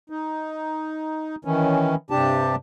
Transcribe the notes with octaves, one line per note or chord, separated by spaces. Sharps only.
D#4
D#3 E3 C#4
G2 C3 D4 G4 A5